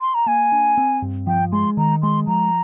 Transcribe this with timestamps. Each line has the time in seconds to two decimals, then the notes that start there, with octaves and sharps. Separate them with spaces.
0.01 C6
0.14 A#5
0.26 A#3 G#5
0.52 D4
0.78 C4
1.02 G2
1.27 F3 G5
1.52 G#3 C6
1.77 D#3 A#5
2.02 G#3 C6
2.27 F3 A#5